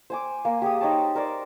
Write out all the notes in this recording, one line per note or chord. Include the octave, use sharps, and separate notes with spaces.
C5 G#5 D6
A#3
G4 G#4 E5 D#6
D#4 C5 C#5 A5
A#4 C5 D5